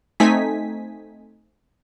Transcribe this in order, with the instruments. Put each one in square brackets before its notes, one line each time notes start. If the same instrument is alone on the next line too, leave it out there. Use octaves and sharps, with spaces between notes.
[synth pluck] A3 C4 D#4 G#5 B6